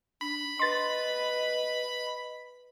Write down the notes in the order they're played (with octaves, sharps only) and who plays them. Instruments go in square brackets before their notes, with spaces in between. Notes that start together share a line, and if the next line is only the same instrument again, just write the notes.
[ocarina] D4 [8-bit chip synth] B5
[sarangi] B4 [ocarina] D#5 [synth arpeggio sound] C6 A6